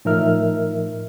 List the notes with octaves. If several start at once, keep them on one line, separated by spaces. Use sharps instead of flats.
A2 F3 D#4 A#4 E5 F6